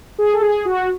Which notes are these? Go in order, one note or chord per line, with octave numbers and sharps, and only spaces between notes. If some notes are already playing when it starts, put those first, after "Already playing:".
G#4
A4
G#4
F#4